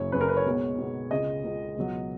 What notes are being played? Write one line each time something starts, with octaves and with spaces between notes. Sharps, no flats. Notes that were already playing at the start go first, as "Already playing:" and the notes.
Already playing: F#1 F#2 C#3 C#5
F#1 F#2 C#3 B4
A#4
B4
C#5
B1 B2 G#3
B1 B2 G#3
C#2 C#3 G#3 D#5
C#2 C#3 G#3
C#2 B2 F#3